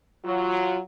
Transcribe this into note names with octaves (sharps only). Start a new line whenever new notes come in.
F#3 F4